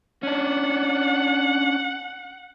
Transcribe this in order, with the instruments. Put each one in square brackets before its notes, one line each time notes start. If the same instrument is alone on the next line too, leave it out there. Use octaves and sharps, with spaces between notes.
[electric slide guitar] C#4 D4 [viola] F#5